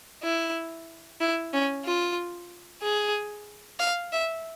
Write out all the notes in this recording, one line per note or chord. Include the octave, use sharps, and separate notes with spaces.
E4
E4
C#4
F4
G#4
F5
E5